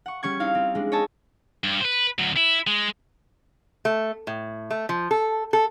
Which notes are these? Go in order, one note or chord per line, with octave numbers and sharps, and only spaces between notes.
F#5 C#6
G3 C#4 C#6 G#6
C4 D#4 E4 F5
C4
G#3 D4
C#5 D#5 E5 G#5 A5
G2
B4 C5
D2 F#3
E4
G#3
A3
A2
A3
F3
A4
A4